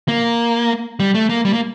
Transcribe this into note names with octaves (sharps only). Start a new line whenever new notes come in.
A#3
G3
A3
A#3
G3
A#3